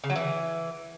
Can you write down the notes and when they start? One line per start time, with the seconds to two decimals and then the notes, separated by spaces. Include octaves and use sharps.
0.04 C#3
0.10 F#3
0.16 E3